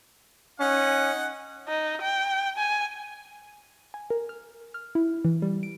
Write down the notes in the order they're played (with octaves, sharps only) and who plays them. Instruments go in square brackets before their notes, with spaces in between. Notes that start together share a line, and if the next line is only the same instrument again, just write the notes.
[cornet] C#4 [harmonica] D#4 F#5
[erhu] D#4
G5
G#5
[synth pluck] G#5
A#4
F6
F6
E4
E3
G3
D7